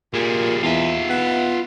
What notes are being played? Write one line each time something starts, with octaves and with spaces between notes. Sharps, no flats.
A#2 G3 G#4
E2 F4 E5
B3